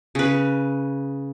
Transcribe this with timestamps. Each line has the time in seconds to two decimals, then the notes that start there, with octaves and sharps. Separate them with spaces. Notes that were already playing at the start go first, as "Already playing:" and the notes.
0.15 C#3 B4